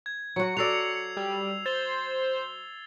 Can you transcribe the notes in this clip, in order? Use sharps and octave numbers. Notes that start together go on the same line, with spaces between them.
G#6
F#3 F#4 C#7
F#4 A4 D5 E6 C7 F7
G3
C5 A6 G7